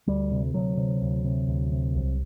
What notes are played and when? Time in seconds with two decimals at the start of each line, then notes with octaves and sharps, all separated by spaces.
0.07 D2 G3
0.31 C3
0.53 D2 F#3
0.77 C3
1.01 D2
1.24 C3
1.48 D2
1.72 C3
1.95 C2